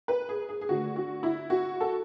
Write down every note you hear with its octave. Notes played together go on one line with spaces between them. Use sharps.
B4
G#4
G#4
G#4
D3 A3 F#4
F#4
E4
F#4
A4